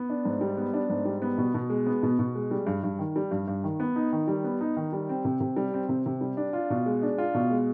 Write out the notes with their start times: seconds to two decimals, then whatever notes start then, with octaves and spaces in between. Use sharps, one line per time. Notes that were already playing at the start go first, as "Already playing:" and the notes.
Already playing: B3
0.10 D4
0.25 G#2
0.41 G3
0.57 B3
0.74 D4
0.89 G#2
1.05 G3
1.22 B3
1.38 B2
1.54 B2
1.70 G#3
1.86 B3
2.03 B2
2.19 B2
2.35 G#3
2.51 G3
2.67 G2
2.83 G2
2.99 D#3
3.16 G3
3.31 G2
3.48 G2
3.64 D#3
3.80 B3
3.96 D#4
4.13 D#3
4.28 G3
4.44 B3
4.61 D#4
4.77 D#3
4.93 G3
5.09 C4
5.25 C3
5.40 C3
5.57 G3
5.73 C4
5.89 C3
6.06 C3
6.21 G3
6.37 D4
6.53 F4
6.70 B2
6.86 G#3
7.03 D4
7.18 F4
7.35 B2
7.50 G#3